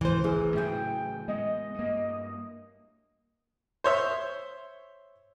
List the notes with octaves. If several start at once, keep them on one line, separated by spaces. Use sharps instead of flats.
C#2 B2 E3 C5
A1 E3 G#4
A2 C#3 F#3 E4 G#4 G5
G#3 B3 D#5
G2 A#3
C5 C#5 E5